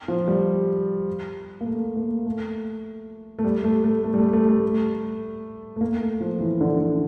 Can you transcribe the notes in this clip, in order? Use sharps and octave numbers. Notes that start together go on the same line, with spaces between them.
F3
G3
A#3
A3
A#3
A3
A3
G3
A3
A3
A3
G3
A3
A3
A3
A3
A#3
A3
F3
E3
D3
D3